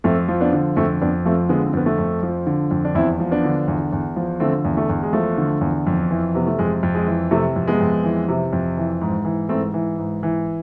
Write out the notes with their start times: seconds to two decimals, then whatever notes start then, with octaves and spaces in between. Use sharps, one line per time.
0.04 F2 A3 C4
0.28 F3
0.41 B3 D4
0.53 D3
0.77 F2 A3 C4
1.02 F2 B3 D4
1.25 F3 A3 C4
1.49 D3 G#3 B3
1.67 C4
1.73 F2 B3
1.86 A3
1.99 F2
2.23 F3
2.47 D3
2.71 F2
2.85 D4
2.95 E2 C4 E4
3.20 F3
3.31 B3 D4
3.44 D3
3.68 E2
3.93 E2
4.16 F3
4.40 D3 A3 C4
4.65 E2
4.77 A3
4.89 E2
5.03 G#3
5.13 F3 A3
5.38 D3
5.61 E2
5.87 F2
6.11 E3
6.35 C3 B3
6.47 A3
6.59 F2 G#3
6.83 F2
6.95 G#3
7.07 E3
7.31 C3 A3
7.56 F2
7.67 G#3 B3
7.81 F2
8.04 E3
8.29 C3
8.53 F2
8.78 E3
9.01 G#2
9.25 E3
9.49 G#2 A3 C4
9.74 E3
9.98 G#2
10.23 E3